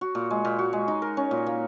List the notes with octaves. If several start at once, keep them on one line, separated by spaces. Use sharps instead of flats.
F#4
A#2
G#3
A#2
F#4
G#3
D#4
A#4
C#4
A#2
A#3